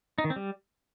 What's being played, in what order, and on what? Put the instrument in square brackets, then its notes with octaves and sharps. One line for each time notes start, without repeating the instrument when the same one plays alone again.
[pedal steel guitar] D#4
D#3
C4
G3